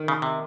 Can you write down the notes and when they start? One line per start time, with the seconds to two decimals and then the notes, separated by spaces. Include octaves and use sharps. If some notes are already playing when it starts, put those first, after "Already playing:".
Already playing: D#3
0.08 C#3
0.22 C3